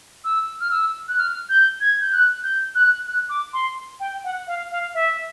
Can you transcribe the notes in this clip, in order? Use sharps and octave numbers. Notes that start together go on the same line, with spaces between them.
E6
F6
E6
F#6
F6
G6
G#6
G6
F#6
G6
F#6
F#6
D6
C6
G5
F#5
F5
F5
E5